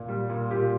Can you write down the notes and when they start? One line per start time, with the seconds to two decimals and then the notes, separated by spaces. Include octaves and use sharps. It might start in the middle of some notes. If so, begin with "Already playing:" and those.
Already playing: A#2
0.08 G3
0.29 A#2
0.50 A#2 F4 G4